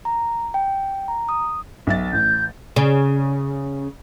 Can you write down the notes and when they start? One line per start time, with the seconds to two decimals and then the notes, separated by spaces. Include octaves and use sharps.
0.05 A#5
0.54 G5
1.08 A#5
1.29 D#6
1.87 B1 E5 A6
2.13 A1 G6
2.76 C#3